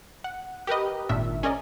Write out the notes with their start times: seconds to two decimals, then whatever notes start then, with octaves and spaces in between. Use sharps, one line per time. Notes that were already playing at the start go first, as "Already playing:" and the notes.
0.24 F#5
0.67 G4 A#4 B4 D#5
1.09 G#1 A#2 D#3 D4 E5
1.43 C#4 G#4 A#4 D5 D#5